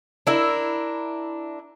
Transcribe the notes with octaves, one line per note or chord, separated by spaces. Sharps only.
D4 E4 A#4